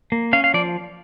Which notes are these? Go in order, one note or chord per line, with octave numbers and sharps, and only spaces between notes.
A#3
C#4 F5
F5
F3 D5